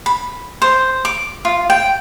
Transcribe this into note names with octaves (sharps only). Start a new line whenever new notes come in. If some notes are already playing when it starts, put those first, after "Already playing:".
B5
C5
D6
F4
G5